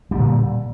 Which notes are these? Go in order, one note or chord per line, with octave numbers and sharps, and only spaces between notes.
A#2 D3 G3